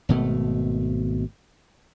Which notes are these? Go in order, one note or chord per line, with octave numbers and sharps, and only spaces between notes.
G#1 B2 A3